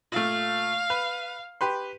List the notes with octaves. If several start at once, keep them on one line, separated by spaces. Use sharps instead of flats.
A#2 A3 F5
B4
G4 B4 C6